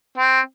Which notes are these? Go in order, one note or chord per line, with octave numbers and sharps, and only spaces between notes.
C4